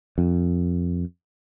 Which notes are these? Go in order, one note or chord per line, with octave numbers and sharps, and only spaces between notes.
F2